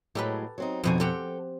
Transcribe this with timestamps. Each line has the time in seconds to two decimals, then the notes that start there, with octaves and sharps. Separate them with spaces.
0.15 A2 F#3 G#3 G4 A4 B4
0.58 F#3 C4 D#4
0.84 F2 B2 D3 C4 D#4 G#5
1.00 C4 G4 A4 F#5 G5